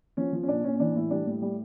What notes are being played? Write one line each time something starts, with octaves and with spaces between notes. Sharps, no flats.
F3 C#4
F3
C#4
A#2 D4
A#2 C#4
C#4
E3 D4
A2 E4
G3 D4
A2
G3